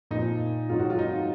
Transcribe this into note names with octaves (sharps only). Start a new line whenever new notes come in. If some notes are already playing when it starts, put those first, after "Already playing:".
A#2 F3 D#4
G#2 D#3 F#3 F4
F#4
F4
D#4